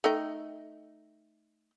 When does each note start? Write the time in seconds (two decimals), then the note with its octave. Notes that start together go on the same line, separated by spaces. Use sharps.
0.04 A3 D#4 G5